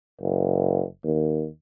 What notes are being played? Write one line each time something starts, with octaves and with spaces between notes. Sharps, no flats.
F#1
D#2